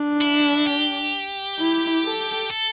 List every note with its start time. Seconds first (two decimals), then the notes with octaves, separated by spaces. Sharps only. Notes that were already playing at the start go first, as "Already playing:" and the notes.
Already playing: D4
0.21 E4
0.67 G4
1.59 E4
2.05 A4
2.51 A4